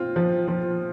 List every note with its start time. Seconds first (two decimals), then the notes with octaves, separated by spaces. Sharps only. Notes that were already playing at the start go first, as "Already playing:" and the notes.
Already playing: C4 F4
0.16 F3
0.48 F3